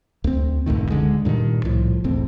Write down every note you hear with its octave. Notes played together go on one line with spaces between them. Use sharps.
D2 C4
F#1 C#2 A2 D#3
D1 D3 G#3
G2 A#2 D3 D#3
C2 A2 F3
F#1 E2 A2 C4